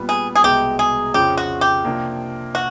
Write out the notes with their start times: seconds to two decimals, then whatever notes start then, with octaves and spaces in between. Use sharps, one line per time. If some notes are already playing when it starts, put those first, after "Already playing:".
Already playing: A#2 G3 B3
0.09 G#4
0.35 G#4
0.43 C2 B2 G#3 G4
0.79 G#4
1.14 F2 C#3 F3 G4
1.37 F#4
1.61 G4
1.84 C3 F3 A#3 D4
2.55 F#4